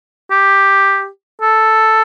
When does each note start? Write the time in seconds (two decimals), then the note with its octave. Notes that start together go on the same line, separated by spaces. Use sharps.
0.31 G4
1.41 A4